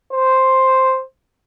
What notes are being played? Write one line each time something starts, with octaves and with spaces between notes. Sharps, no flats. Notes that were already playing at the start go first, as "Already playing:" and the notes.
C5